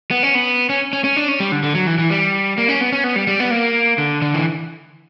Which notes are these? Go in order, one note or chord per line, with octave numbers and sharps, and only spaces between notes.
B3
C#4
B3
C#4
C#4
C#4
D4
C#4
G3
D3
D3
F#3
E3
E3
G3
A#3
C#4
B3
C#4
B3
G3
G3
B3
A#3
D3
D3
E3